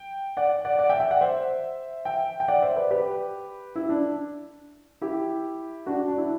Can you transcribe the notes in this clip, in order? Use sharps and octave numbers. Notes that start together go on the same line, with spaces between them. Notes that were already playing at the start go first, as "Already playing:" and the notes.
Already playing: G5
D5 F#5
D5 F#5
D5 F#5
E5 G5
E5 G5
D5 F#5
C5 E5
E5 G5
G5
D5 F#5
C5 E5
B4 D5
G4 B4
E4
D4
E4 G4
D4 F#4
D4
E4